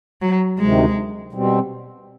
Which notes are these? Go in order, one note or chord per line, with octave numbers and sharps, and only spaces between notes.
F#3
D2 C3 D#3 G#3
B2 G3 C4